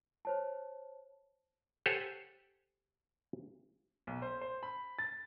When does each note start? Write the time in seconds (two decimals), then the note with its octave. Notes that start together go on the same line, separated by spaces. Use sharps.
0.25 C5 C#5 A5
1.86 G4 A4 C5 C#5 F#5 G#5
4.07 B1
4.22 C5
4.41 C5
4.63 B5
4.99 A6